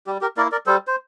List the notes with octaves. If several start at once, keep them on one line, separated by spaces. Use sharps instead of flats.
G3 G4
G4 A#4
A#3 E4 A#4 D5
A#4 D5
G3 A4 C5
C5